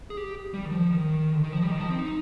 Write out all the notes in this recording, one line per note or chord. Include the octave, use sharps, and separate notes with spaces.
G#4
G4
G3
D#3
F3
D#3
D3
D#3
F3
G3
D#3
F3
C4
D#4